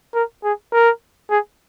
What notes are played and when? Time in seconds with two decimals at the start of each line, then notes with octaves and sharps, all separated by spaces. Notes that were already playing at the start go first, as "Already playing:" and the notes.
0.15 A#4
0.44 G#4
0.73 A#4
1.30 G#4